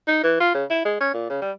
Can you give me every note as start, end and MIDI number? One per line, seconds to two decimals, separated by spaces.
0.08 0.22 63
0.23 0.38 52
0.40 0.52 65
0.54 0.64 49
0.70 0.82 64
0.85 0.97 56
1.00 1.13 61
1.14 1.28 46
1.30 1.40 49
1.41 1.52 55